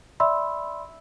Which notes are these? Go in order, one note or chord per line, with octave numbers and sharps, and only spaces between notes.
D5 E5 B5 C6 E6